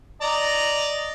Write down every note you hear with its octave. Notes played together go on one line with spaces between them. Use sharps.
D5 D#5 A#5